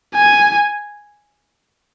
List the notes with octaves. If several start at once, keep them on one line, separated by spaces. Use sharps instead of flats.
G#5